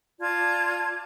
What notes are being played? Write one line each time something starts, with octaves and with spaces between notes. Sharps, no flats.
F4 D5 A5 G#6